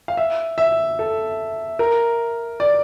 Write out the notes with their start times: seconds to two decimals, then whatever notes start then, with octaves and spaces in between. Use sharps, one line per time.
0.08 F5
0.17 E5
0.58 E5
0.99 A4
1.79 A#4
2.60 D5